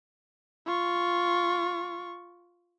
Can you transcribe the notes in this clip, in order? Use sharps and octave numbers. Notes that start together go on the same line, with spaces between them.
F4 C#6